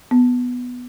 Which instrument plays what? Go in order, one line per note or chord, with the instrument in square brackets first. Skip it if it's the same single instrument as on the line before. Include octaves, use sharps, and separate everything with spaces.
[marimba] B3